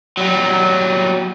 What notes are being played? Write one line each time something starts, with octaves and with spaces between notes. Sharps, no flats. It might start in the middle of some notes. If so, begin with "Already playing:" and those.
F#3 G3